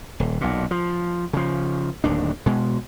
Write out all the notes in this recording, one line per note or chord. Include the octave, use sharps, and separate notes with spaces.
D#1
B1 A#2
F3
C#3 F3
D1 D#2 D#3 D4
B2 G#3